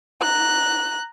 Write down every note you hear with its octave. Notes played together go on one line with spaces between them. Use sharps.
A#5 F#6